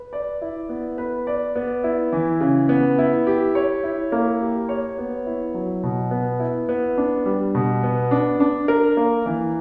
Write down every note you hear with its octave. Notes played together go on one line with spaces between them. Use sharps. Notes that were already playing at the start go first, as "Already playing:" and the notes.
Already playing: B4
D5
E4
B3
B4
D5
B3
E4
E3
C#3
B3
E4
G4
C#5
E4
A#3
G4
C#5
B3
E4
F#3
B2
B3
E4
B3
D4
G3
B2
B3
D4
D4
A#4
A#3
E3